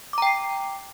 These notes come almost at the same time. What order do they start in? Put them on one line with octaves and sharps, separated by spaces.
D6 A#5 G5 C7